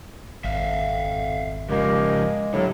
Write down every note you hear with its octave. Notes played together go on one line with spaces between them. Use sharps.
G#1 F2 E5 F5
C#3 F3 G#3 A#3 G4 A#4
D#2 A2 D3 F#3